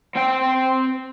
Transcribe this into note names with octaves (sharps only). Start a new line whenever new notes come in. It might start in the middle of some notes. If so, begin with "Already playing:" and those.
C4 G5